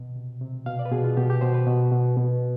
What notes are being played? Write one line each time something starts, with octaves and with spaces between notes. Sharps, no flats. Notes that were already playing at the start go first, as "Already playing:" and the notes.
Already playing: B2
C3
C3
B2 F5
D5
B4
B2 G#4
F4
B2 G4
G4
B2 C5
B4
B2
B2
B2